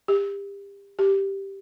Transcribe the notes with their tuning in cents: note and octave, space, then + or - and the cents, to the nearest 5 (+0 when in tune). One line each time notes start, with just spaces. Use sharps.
G4 +30
G4 -5